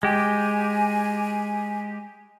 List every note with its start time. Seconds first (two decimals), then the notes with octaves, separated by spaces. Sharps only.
0.03 G#3 G4 G#5